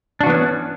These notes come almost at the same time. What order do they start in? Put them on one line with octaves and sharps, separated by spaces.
D4 F#4 E3 B3 C#4